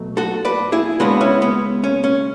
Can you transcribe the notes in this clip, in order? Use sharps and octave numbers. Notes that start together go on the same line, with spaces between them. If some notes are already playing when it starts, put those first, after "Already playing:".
Already playing: B2 F#3 A3
F#4 A4
B4 D5
E4 G#4
C#3 G#3 B3 D4 F#4
C#4 E4
B3
C#4
C#4